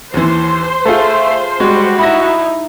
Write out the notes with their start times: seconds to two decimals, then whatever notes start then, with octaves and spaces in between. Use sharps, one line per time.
0.14 D#2 E3 C5
0.85 A3 F4 G#4 A4
1.60 G3 G#3 F#4
1.99 D#4 E4 B5 A#6